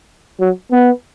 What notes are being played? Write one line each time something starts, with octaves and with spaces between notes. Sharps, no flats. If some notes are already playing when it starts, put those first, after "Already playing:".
F#3
B3